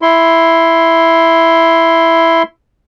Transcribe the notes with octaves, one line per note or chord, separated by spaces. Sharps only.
E4 C6